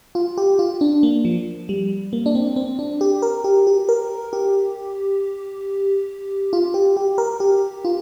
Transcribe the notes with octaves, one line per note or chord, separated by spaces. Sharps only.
F4
G4
F4
D4
A#3
F3
G3
A#3
D4
C4
C4
D4
G4
A#4
G4
G4
A#4
G4
F4
G4
G4
A#4
G4
F4